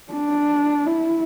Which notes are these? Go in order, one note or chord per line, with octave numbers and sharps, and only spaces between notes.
D4
E4